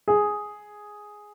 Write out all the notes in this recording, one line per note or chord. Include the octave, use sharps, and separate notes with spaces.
G#4